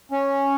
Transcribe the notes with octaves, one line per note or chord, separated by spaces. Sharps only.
C#4